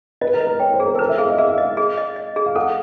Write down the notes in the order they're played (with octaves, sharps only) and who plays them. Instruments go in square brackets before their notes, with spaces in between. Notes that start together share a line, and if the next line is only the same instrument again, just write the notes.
[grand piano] B4 [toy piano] D#5
[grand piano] A#4
[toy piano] D#5
[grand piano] A#4
[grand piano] C#5 [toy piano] G5
[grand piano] C5
[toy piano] G#4
[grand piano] A#4
A4
[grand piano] A#4 [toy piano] B4
[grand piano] E5
[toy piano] G#4 [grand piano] F5
[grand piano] D#5
[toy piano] G#4 [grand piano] E5
[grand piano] F5
[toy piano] D#5
[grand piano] F5
[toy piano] G#4
D#5
D#5
G#4
[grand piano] F5
[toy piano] A4 [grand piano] F#5